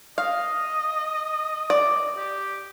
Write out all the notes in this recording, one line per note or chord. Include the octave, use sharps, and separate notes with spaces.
D#5 F5
D5
G4